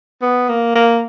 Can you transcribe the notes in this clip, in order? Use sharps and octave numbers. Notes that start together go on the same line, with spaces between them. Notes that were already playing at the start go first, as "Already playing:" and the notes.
B3
A#3
A#3